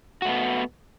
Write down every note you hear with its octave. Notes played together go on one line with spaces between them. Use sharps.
A3 B3 F#4